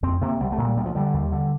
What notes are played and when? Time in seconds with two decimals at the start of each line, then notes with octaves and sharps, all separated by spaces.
0.03 F2 C4
0.21 C3 A#3
0.40 C2 G3
0.52 A3
0.58 A#2
0.64 G3
0.77 D2 G3
0.86 F3
0.95 D3 G3
1.14 D#2
1.32 D3